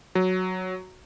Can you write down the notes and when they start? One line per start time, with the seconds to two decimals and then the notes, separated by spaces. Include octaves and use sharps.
0.15 F#3